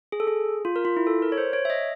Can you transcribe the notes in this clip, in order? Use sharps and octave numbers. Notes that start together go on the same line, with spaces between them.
G#4
A4
G#4
F4
A#4
F4
E4
A4
A#4
C#5
C5
C#5
E5
D#5